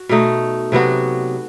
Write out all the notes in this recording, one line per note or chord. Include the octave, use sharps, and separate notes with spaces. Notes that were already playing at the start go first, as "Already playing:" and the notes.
Already playing: F#4
B2 A3 D#4
C3 F#3 B3 F#4